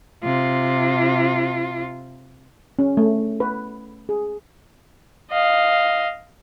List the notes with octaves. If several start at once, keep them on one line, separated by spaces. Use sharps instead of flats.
C3 F4
C#4
A3
B4
G#4
D#5 F5